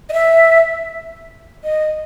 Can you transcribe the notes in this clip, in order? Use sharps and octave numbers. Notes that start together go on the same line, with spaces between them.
D#5
E5
D#5